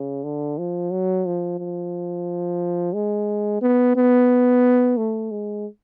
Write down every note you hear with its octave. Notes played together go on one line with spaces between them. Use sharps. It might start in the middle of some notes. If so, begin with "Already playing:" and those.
Already playing: C#3
D3
F3
F#3
F3
F3
G#3
B3
B3
A3
G#3